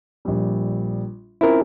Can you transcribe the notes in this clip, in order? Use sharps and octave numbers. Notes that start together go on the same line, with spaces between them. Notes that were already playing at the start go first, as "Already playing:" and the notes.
A#1 G3
C4 C#4 E4 F4 A#4